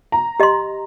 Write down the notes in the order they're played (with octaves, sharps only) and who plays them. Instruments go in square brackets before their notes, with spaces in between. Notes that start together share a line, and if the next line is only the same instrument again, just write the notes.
[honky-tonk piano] A#5
[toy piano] G4 D#5 C6